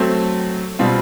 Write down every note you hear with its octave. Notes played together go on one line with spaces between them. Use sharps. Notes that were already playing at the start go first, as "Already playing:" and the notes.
Already playing: F#3 A3 C4
B2 G3 C4 F4